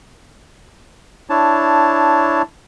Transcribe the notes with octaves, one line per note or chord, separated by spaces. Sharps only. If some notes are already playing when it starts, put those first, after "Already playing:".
D4 E4 C#5 A5